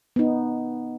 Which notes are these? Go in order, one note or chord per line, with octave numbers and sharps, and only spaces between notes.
B3 D#4